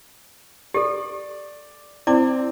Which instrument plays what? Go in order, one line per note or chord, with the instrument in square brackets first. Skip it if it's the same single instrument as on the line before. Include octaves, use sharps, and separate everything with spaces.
[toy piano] G4 A4 [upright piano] D5
[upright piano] C4 [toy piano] E4 D5 D6